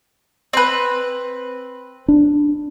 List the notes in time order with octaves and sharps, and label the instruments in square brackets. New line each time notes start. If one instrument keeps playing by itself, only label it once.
[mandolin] C4 B4
[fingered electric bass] D4